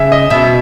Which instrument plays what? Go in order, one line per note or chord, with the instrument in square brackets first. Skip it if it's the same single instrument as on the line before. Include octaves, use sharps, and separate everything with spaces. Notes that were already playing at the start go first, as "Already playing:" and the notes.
Already playing: [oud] C#3 [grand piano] E5 G#5
[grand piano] D#5
[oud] B2 [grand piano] E5